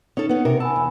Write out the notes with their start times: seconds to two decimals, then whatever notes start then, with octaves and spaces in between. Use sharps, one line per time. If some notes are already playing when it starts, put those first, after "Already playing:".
0.17 C#4 D#4 A4
0.29 B3 C#4
0.45 C3 A#4
0.60 G#5 A5 B5 E6
0.76 E2